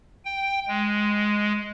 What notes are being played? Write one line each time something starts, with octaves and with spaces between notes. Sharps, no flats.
G5
G#3